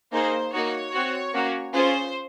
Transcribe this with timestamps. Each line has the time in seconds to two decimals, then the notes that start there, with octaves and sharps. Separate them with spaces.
0.13 A#3 D#4 G#4 C5
0.53 A#3 D#4 F#4 C#5
0.92 C4 F#4
1.34 A#3 C#4 F#4
1.73 C#4 F4 G#4 C5